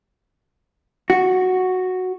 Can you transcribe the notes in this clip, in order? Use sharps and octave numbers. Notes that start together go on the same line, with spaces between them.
F#4